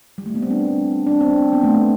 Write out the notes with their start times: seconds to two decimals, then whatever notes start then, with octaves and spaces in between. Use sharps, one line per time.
0.18 G3
0.26 A3
0.35 B3
0.42 C4
0.51 D4
1.07 D4
1.21 C4
1.53 B3
1.64 A3